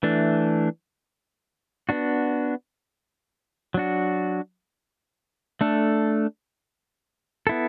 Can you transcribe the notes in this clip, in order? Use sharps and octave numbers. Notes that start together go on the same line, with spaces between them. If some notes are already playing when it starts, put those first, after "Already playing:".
E3 A3 D4
B3 D4 F#4
F#3 D4 F#4
A3 D4 A4
B3 E4 A4